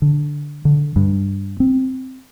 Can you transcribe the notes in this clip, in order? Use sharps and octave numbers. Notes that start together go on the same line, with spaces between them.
D3
D3
G2
C4